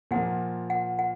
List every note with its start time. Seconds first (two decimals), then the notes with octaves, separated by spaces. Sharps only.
0.11 A#2 F3 A#3 F#5
0.70 F#5
0.99 F#5